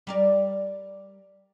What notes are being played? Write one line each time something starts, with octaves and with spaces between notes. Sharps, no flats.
G3 A#4 D5